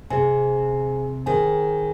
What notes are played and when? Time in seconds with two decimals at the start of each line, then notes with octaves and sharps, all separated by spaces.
0.10 C3 G#4 C5 G#5
1.26 D#3 G#4 C5 G#5